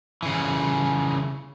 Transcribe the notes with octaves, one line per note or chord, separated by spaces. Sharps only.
C#3 E3